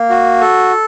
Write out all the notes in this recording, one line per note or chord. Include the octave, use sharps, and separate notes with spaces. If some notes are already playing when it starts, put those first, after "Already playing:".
Already playing: A#3
F#4
A4